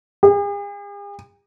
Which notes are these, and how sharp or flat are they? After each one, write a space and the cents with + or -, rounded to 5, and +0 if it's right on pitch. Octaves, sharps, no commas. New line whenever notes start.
G#4 -45